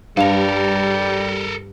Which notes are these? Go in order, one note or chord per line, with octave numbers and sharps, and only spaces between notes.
G2 G3 A4 A#4 F5 F7